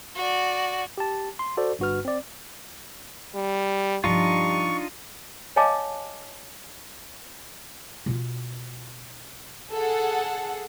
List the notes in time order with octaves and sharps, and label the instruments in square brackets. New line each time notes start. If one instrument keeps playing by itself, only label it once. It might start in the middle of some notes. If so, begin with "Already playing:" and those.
[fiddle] F#4 D5
[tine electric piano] G4 A5
C6
F#4 A4 C5 D5
G1 G2 F#4 B4 F6
C4 D5
[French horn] G3
[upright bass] G2 F3 [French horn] G3 [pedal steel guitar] D4 D#4 F4 [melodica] C#6
[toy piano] C#5 D#5 F5 G#5 A5 D6
[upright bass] B2 F4
[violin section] G#4 A4 F#5